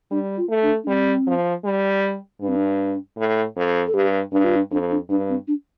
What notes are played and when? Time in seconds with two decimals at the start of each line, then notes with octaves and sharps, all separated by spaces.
0.11 G3 D4
0.37 F4
0.49 A3
0.63 D4
0.84 D4
0.88 G3 C4
1.27 F3
1.64 G3
2.41 G2 D4
2.48 C4
2.56 D4
3.17 A2
3.57 F2
3.87 A4
3.94 G2 G4
4.32 G2 D4
4.44 F4
4.56 D4
4.71 F2 D4
4.91 D4
5.09 G2 D4
5.29 C4
5.48 D4